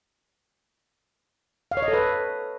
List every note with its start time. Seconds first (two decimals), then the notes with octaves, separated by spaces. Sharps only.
1.71 F5
1.77 C#5
1.82 D#5
1.88 A4
1.93 B4